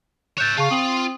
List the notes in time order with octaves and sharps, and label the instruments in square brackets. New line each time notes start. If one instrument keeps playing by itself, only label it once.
[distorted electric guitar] C#5 E5 [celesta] F#6 G6 A6
[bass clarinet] C#3 [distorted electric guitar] F4 [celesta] A5 C#6
[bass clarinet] C4 [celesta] D#6 F#7